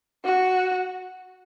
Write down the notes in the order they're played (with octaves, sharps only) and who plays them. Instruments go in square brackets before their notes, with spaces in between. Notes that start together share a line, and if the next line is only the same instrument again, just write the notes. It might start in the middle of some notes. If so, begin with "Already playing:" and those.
[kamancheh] F#4